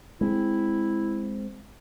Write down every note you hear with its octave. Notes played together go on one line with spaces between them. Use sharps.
G#3 C4 E4